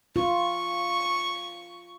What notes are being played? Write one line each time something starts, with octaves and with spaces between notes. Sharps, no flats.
F4 C#6